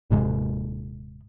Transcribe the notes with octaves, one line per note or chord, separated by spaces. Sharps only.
D#1 G#2 C3 G#3